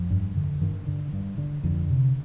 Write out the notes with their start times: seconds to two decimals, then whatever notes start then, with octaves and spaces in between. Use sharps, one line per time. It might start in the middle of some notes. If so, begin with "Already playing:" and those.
Already playing: F2 F3
0.11 G2
0.36 D3
0.62 G2 D#3
0.87 D3
1.13 G2
1.38 D3
1.63 F2 D3
1.90 C3